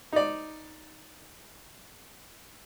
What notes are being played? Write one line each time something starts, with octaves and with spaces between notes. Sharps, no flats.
D#4 D5